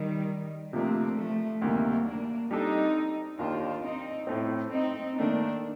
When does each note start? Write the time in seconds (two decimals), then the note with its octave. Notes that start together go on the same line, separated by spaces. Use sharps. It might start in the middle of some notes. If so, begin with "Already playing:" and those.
Already playing: D#3 G3
0.73 C3 F3 A3 A#3 C4 D4
1.17 F3 A3
1.61 D2 C3 D#3 G3 A#3
2.06 A#3 D4
2.50 G3 C4 D4 D#4 A4
3.38 D#2 D#3 A#3 D4 D#4 F4 G4
3.83 C4 D#4
4.27 A2 A3 C4
4.72 C4 D#4
5.16 D#3 A3 A#3 D4 D#4